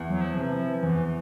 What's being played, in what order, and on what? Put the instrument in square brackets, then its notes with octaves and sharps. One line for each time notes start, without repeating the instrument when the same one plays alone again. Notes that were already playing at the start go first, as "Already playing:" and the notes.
Already playing: [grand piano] E2
[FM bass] F#3
F3
[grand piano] C3 E3
[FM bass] F3
[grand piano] E2 [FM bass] E3